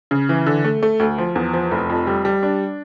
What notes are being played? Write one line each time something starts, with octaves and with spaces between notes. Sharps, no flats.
C#3
E3
D3
A3
A3
D2
F3
E2
F3
F1
F2
G3
G3
D4